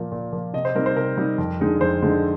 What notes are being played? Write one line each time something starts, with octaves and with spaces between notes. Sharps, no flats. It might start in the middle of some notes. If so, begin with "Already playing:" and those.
Already playing: A#2 F3 A#3
A#2
F3 A#3
C3 D#5
C5
G3 C4 D#4 A#4
C5
C3 A#4
G3 C4 D#4
F2
D3 G#3 D#4
F2 C5
D3 G#3 D#4